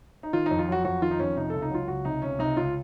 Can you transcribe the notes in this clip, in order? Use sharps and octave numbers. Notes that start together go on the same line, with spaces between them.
D#4
D#3 F4
F2 D#4
F4
F#3 F#4
F2 F#4
D#3 F4
D#4
F2 C#4
C3 D#4
C#2 A4
D#4
F#3 F4
C#2 F#4
C3 D#4
C#2 C#4
C3 D#4
C#2 F4